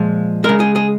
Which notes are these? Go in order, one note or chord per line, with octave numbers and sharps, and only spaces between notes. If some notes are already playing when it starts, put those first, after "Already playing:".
Already playing: A#2 F3 G#3
C#3 G#3 A#4
G#4
G#4